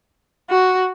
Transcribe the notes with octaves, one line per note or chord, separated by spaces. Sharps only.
F#4